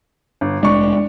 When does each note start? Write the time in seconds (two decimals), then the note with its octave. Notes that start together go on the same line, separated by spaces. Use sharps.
0.41 G1
0.63 F1 G#3 D4 C#6